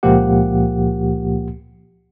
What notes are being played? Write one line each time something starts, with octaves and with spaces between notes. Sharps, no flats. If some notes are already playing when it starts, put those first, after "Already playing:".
C#2 A#2 F3 A#3 G4 F#5